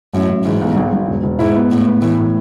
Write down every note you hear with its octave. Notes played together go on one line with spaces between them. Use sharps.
A1 F#2
A1
G#2 E3
B1
G#1
G#1
E1
E1
G#2 E4
B3
A2 B3
B3
A2 E3
A2